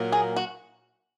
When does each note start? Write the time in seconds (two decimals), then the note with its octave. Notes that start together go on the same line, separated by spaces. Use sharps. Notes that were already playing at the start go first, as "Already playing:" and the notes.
Already playing: A#2 F#3 A#3 F4 A#4
0.12 G#4
0.36 F#4